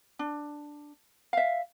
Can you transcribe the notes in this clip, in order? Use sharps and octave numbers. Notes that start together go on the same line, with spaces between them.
D4
E5 F5